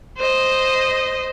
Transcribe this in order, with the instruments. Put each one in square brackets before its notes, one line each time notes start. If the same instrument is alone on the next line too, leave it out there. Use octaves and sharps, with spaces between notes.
[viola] C5 D#5